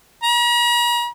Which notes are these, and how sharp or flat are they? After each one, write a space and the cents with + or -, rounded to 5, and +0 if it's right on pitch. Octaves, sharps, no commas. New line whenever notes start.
A#5 +45